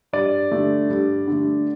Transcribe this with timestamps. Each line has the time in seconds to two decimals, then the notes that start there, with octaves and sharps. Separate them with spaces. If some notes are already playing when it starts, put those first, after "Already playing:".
0.13 G2 D5
0.52 D3 A3
0.90 G2
1.27 D3 A3